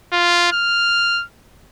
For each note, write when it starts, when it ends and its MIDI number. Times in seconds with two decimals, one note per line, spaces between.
0.13 0.52 65
0.52 1.23 89